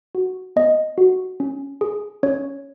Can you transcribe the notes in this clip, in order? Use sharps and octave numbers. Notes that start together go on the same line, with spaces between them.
F#4
B3 D#5
F#4
C#4
G#4
C#4 C#5